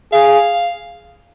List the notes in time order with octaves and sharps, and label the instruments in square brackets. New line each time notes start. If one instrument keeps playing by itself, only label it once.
[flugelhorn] G#4 [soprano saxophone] F5